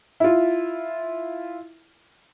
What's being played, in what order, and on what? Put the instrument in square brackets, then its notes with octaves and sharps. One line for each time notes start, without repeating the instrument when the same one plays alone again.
[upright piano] E4 F4